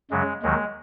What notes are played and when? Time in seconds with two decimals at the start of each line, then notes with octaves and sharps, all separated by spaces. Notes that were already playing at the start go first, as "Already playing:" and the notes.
0.11 F#2 C#3 F#3 G#3
0.43 D#2 D#3 F#3 G#3